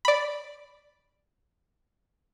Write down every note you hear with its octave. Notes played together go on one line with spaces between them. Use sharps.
D5 B5